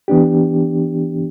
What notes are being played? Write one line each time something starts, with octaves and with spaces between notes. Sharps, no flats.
E3 B3 D4 G4